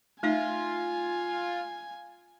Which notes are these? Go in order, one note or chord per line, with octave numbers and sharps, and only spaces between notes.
A3 D#4 F4 E5 G#5